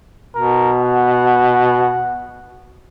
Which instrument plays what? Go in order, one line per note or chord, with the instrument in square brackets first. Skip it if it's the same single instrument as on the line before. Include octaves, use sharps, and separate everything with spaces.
[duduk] B2 [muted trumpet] A#4
[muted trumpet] F#5